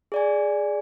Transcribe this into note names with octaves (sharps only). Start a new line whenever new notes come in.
G#4 D5 G#5